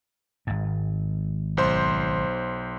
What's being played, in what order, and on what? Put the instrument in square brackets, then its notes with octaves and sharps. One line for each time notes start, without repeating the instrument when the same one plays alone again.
[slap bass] G#1 G#2
[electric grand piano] B1 C5 C6